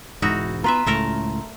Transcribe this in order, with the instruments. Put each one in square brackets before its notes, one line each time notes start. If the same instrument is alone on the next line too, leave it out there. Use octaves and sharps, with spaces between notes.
[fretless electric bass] E1 G#2 [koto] D#4 E4 F#4
[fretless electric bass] A#3 B3 [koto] F4 B4 E5 [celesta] A#5 C6
[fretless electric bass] C#2 A2 [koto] A3 A4 A#4